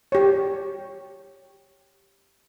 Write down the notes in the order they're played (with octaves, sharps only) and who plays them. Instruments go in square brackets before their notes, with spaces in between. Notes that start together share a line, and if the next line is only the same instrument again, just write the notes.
[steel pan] G4 C#5